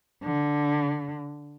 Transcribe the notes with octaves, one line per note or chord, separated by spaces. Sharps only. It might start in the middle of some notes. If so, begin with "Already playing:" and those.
D3